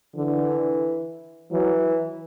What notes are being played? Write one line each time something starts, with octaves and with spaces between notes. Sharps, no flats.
D3 E3
E3 F#3